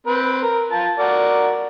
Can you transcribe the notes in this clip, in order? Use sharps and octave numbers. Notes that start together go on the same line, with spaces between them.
C4 B4
A#4
F4 A5
F#4 A#4 D5